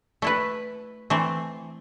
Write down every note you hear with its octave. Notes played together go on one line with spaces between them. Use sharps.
A3 E4 B4
E3 A3 C4